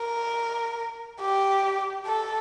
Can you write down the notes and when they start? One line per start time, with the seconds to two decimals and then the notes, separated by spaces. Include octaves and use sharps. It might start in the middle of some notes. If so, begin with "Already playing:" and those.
Already playing: A#4
1.20 G4
2.06 A4